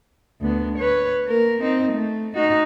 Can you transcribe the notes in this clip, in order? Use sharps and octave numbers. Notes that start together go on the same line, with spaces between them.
D2 B3
B4 C#5
A#3 A#4
C4 D#4
A3
D#4 F#4